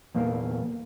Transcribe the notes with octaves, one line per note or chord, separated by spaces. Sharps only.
E2 A#2 A#3